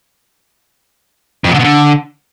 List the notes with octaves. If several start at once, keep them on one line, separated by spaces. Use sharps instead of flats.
F2
A#2
D3
B2
D3